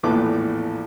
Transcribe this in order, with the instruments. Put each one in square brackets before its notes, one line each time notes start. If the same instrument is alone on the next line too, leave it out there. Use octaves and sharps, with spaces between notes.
[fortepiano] A#1 E2 A2 A3 B4 D6